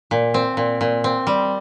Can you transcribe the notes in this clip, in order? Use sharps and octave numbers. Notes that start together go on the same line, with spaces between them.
A#2
C4
A#2
A#2
C4
G3